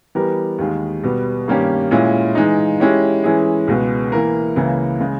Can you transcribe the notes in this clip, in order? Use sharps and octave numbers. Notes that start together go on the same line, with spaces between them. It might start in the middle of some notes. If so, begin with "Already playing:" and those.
E3 G3 B3 G4 A#4
D#2 D#3 G#3
B2 G3 B3
G2 D#3 A#3 C#4 G4
A#2 G#3 C#4 E4
E3 G#3 D#4
G#3 C#4 E4 G4 C#5
E3 G#3 C#4 E4 G#4
C#2 B2 G#3 B3
E3 A#3 E4 A#4
C#2 C#3 E3 A#3 E4
C#3 G#3